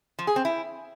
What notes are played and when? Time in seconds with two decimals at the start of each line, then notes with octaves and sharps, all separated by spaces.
0.19 F3
0.27 G#4
0.36 C4
0.45 E4